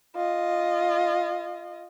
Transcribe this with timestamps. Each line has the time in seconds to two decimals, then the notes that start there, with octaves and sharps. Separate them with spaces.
0.16 F4 D#5